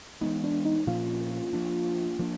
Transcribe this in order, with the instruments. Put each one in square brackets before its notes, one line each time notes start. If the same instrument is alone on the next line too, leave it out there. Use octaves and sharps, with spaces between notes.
[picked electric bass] E3 G#3 B3 [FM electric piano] D#4
[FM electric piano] D4
D#4
[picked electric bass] A#2 F3 A#3 C#4 [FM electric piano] F4
[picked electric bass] F3 A#3 D4
F3 A#3 D4